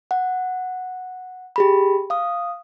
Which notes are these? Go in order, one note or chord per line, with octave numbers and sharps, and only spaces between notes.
F#5
G4 G#4 B5
F5 D#6